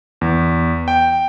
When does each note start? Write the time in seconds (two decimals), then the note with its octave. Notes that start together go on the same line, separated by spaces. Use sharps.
0.21 E2
0.88 G5